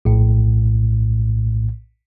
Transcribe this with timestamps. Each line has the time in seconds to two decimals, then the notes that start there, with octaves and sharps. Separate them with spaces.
0.05 A#1 A2